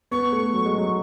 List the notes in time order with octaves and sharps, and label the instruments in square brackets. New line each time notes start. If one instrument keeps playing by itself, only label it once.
[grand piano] B3 [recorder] C#6
[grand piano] A3
F#3
G#3
F#3